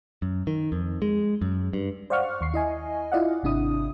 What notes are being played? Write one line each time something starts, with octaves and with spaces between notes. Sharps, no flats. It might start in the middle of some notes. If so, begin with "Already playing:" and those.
F#2
D#3
F2
G#3
F#2
G2
C5 D5 F5 F#5 C#6 F6
D#2 C#6 C7
E4 D#5 G#5
E4 F4 D5 D#5 F5 F#5
G#1 C3 D4 E4 D#6